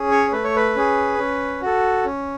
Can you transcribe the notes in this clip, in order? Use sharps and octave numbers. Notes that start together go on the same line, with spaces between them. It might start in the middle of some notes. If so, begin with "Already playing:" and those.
Already playing: C#4 G#4
C#5
A3 B4
C#5
B4
C#4 G#4
C#4
F#4 A4
C#4